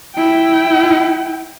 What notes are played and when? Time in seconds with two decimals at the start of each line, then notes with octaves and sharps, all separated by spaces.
0.15 E4 G5